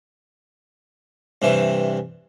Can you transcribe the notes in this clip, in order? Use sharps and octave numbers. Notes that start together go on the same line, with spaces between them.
G2 C3 E3